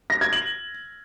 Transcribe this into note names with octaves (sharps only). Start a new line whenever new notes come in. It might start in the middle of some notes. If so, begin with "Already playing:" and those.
A#6
G#6
F#7